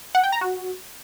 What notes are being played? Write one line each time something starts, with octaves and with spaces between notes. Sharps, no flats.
F#5
G5
A#5
F#4